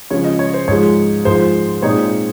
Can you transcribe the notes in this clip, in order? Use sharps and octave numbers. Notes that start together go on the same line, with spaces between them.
C#3 F3 G#3 C#4 C#5
D#5
C#5
C5
G#2 F3 G#3 C#5
G#2 F3 G#3 C5
A#2 G#3 C4 D#4 C#5